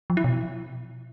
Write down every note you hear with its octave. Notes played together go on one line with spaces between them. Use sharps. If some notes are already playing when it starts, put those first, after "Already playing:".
F3
E4
B2